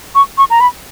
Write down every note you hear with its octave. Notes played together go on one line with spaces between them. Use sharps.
C#6
C#6
A#5
B5